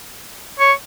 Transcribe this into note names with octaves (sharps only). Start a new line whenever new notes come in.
C#5